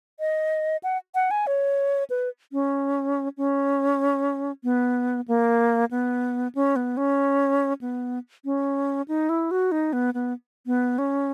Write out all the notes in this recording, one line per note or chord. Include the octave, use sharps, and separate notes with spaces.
D#5
F#5
F#5
G#5
C#5
B4
C#4
C#4
B3
A#3
B3
C#4
B3
C#4
B3
C#4
D#4
E4
F#4
D#4
B3
B3
B3
C#4